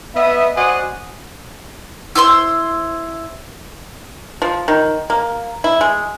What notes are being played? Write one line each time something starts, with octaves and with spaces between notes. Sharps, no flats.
B3 D#5 E5
F#4 C5 D5 D#5 F#5 G#5
E4 C5 C6 E6
F3
D#3
A#3
E4
G#3